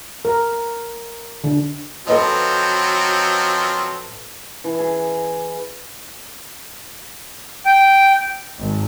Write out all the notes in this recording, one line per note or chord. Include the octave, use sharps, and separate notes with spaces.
A#4
D3
F3 F#3 C4 A4 B4 D#5
E3
G#4
G5
G#1